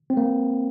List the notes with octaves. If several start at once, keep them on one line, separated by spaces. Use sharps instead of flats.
C4
A#3